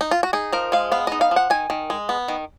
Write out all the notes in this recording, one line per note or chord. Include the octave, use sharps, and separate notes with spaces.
D#4
F4
F#4
D#4 G#4
F3 A#4
G#3 F5
B3 F5
D#4 D#5
F5
F3
F#5
D#3 G#5
D#3
G#3
B3
D#3